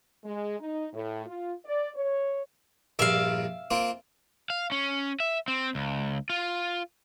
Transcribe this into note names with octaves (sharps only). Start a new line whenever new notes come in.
G#3
D#4
A2
F4
D5
C#5
A#1 G2 A#2 E5 F5
A#3 C4 F4
F5
C#4
E5
C4
C#2
F4